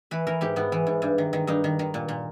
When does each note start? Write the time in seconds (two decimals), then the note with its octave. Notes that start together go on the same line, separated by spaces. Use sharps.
0.11 E3 B4
0.27 E3 A#4
0.41 G#2 G4
0.56 G#2 B3
0.72 E3
0.87 G#2
1.02 G2
1.18 D#3
1.33 D#3
1.47 G2 D#4
1.64 D#3
1.79 D#3
1.94 A#2
2.08 A#2